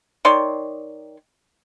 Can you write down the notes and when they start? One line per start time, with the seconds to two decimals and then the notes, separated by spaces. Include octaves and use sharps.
0.25 D#3 C#5 D5 C6